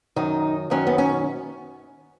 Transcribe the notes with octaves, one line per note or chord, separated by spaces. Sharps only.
F#2 D#3 F#3 D#4
F#2 D#3 F#3 C#4
B3
C#4